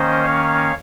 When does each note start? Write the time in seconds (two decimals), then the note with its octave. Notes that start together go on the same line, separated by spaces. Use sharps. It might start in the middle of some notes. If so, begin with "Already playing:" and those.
Already playing: D#3 A#3 C#4 C5 D#5
0.23 C#5 F5